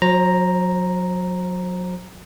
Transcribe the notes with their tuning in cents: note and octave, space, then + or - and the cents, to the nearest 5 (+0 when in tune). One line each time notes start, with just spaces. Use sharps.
F#3 -30 C5 +25 A#5 +0